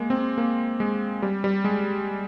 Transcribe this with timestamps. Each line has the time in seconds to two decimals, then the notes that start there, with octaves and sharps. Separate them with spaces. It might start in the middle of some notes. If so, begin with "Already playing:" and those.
Already playing: G#3 A#3
0.10 C4
0.38 A#3
0.80 G#3
1.22 G3
1.44 G3
1.64 G#3